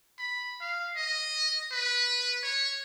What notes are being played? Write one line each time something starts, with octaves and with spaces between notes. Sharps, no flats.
B5
F5
D#5
B4
C#5